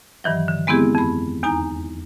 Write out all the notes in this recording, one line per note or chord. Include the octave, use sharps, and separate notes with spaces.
G2 D#3 E3 F#3
D3
G#3 B3 C4 E4 G4 G#4
F2 B5
E2 D#4 G#5 A#5